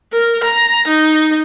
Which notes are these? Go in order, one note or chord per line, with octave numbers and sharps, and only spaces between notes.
A#4
A#5
D#4